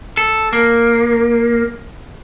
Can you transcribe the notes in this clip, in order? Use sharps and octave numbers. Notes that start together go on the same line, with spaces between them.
A4
A#3